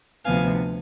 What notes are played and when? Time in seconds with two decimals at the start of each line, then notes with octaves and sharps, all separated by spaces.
0.25 D2 C3 F3 B3 F5 G#5